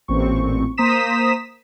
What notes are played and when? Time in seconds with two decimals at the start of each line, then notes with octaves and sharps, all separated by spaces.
0.08 A1 A#2 C4 C#6
0.77 A#3 C5 A#5 D#6 B6 E7